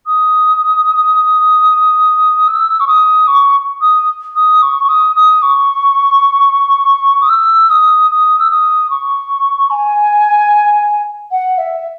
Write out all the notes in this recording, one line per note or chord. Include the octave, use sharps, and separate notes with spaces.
D#6
E6
C#6
D#6
C#6
D#6
D#6
C#6
C#6
D#6
D#6
C#6
D#6
E6
D#6
D#6
E6
D#6
C#6
G#5
F#5
E5